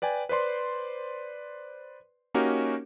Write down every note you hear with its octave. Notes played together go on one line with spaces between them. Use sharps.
B4 D5 G5 G#5
B4 C5 D5 C6
A#3 C#4 D#4 F#4 G4 A#4